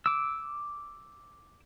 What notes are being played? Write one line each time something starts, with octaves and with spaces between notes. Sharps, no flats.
D6 E6